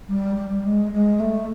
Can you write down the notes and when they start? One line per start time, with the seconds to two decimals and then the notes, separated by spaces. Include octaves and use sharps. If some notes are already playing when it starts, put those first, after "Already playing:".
0.08 G3
0.35 G3
0.64 G#3
0.92 G#3
1.19 A3